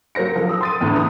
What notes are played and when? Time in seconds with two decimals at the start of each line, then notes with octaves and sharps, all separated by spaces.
0.15 F#3 A#3 C5 A#6 C#7
0.36 F3 A4 A#4
0.49 D#6 E6
0.61 C6 A6 D#7
0.81 E2 A2 D3
0.95 C#3 B4 D#6